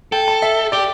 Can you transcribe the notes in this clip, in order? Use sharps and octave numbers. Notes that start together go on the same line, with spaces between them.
A4 G5
A5
E5
G4 D5